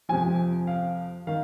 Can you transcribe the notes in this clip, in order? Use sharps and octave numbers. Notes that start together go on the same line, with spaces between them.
F2 C3 F3 G#5
F5
D#3 F5